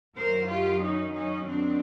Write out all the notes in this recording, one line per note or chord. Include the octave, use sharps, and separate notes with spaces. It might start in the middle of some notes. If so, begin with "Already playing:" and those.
F#2 D#3 F#3 A#4 C5
F4 G4
C#4 D#4
C#4 D#4
F#2 D#3 F#3 C4 D4